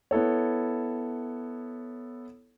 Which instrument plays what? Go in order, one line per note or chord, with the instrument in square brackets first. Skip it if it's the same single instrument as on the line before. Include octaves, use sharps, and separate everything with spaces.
[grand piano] B3 E4 A4 C#5